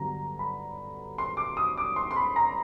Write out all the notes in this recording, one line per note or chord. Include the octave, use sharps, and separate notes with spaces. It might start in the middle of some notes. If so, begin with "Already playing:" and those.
Already playing: G2 D3 F#3 B3 A#5
B5
C6
D6
D#6
D6
C6
C6
B5
A#5